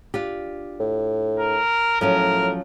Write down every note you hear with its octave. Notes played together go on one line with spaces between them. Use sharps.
D4 F4 G4
A2
A#4
A2 F3 F#3 C#4 A#4